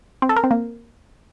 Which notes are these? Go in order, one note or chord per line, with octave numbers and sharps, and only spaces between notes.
C4
A4
A#4
C4
A#3